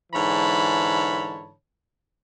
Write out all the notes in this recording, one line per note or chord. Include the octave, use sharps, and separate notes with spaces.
G#2 D3 E3 C#5 A5 B5